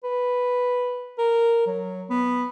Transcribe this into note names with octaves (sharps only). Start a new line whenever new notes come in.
B4
A#4
F#3
B3